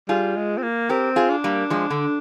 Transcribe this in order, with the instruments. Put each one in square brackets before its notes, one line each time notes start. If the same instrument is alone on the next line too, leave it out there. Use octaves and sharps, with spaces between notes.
[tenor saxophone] G3 [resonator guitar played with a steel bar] F4 G#4
[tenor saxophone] G#3
C4
A#3
[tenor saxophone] C4 [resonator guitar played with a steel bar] G4 A#4
[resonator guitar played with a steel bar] F4 G#4
[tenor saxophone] D4
[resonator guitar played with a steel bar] G3 A#3
F3 G#3
D3